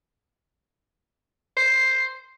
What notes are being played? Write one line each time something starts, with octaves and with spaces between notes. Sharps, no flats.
C5